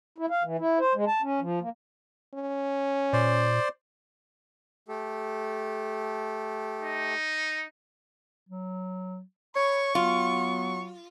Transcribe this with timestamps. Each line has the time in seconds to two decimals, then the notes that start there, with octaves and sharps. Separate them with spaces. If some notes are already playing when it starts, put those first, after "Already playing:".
0.18 E4
0.31 F5
0.44 E3
0.59 E4
0.79 C5
0.95 G#3
1.07 A5
1.22 C#4
1.41 F3
1.61 A#3
2.34 C#4
3.13 A#2 C5 D5
4.88 A3 G4 A4
6.81 D#4
8.49 F#3
9.56 C#5 B5 C#6
9.95 F#3 B3 F4